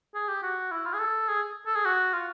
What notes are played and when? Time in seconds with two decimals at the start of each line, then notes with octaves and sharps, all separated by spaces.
0.15 G#4
0.28 G4
0.43 F#4
0.71 E4
0.86 F4
0.94 G#4
1.00 A4
1.28 G#4
1.66 A4
1.76 G#4
1.85 F#4
2.14 F4